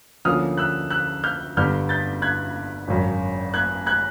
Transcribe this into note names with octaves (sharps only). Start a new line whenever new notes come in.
D2 D3 F3 A#3 C#4 D#6 F6
E6 F#6
E6 F#6
F6 G6
G1 G2 D3 G3 B3 F6 G6
G6 A6
F#6 G#6
G#1 F#2 C#3
F#6 G#6
F#6 G#6